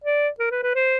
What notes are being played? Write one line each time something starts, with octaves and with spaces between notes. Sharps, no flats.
D5
A#4
B4
B4
C5